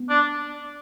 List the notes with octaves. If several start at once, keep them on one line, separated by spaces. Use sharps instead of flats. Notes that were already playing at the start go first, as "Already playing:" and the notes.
Already playing: B3
D4